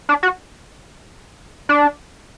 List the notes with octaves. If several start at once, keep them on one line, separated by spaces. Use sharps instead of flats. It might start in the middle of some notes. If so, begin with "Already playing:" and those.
D4
F#4
D4